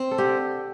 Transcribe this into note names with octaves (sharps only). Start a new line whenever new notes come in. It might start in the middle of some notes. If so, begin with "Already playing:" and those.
Already playing: C4
A4
D3 G4